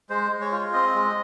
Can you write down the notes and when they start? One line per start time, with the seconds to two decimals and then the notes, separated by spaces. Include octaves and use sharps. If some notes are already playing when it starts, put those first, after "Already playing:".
0.10 G#3 C5
0.31 G#3
0.41 C#5
0.52 F4
0.73 C4 D#5
0.95 G#3